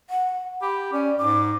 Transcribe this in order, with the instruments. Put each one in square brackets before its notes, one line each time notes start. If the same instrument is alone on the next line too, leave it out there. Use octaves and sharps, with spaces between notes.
[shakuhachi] F#5
[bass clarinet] G4 [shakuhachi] B5
[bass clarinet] C#4 [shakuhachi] D5
[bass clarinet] G#2 [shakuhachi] D6